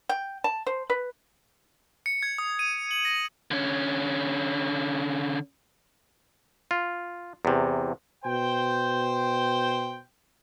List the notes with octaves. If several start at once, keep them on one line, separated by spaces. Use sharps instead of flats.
G5
A5
C5
B4
C#7
G#6
D#6
D#7
F#7
A#6
D3 C#4
F4
E2 C3
B2 C5 G5